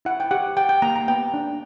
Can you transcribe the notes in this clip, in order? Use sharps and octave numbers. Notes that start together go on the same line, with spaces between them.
E4 F#5
G5
G4 F#5
G4 G5
G5
A#3 A#5
A#5
B3 G5
D4